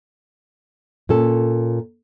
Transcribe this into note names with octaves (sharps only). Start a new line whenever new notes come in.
A#2 C#4 A4